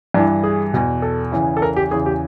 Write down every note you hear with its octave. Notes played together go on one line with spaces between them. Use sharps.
G2 E3 D4
G#4
E2 B2
A4
E2 C#3 E3
A4
A#4
G4
E2 C#3 E3 G#4
G4